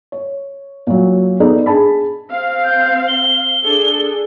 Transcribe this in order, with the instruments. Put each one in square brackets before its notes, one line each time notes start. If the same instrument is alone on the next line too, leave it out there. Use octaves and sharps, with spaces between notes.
[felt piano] C#5
A#2 F#3
B3 D#4 A4 D5
D4 G#4 A5 B5
[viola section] C4 F5
[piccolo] G6
G7
[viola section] D4 G#4 A4